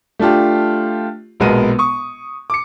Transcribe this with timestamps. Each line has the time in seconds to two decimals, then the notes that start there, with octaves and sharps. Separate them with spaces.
0.19 A3 D4 F4 G4
1.40 A#1 B2 G#3 B3 A#4 D#7
1.79 C#6 D#6
2.50 D6 C#7